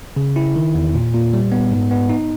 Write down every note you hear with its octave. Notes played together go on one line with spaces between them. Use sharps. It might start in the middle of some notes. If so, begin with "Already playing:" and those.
C#3
E4
D#3
E2
A#2
A#2
G3
B3
G#2
B3
D#4